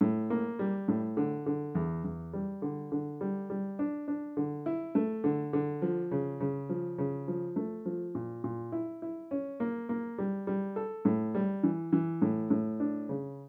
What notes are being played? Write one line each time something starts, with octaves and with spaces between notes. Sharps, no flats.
A2
A#3
G3
A2
D3
D3
E2
E2
G3
D3
D3
G3
G3
D4
D4
D3
E4
A3
D3
D3
F3
C#3
C#3
F3
C#3
F3
A3
F3
A#2
A#2
E4
E4
C#4
A#3
A#3
G3
G3
A4
A2
G3
E3
E3
A2
A2
D4
C#3